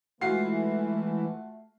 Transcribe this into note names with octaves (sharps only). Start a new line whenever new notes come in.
E3 G#3 A3 F4 F#4 C7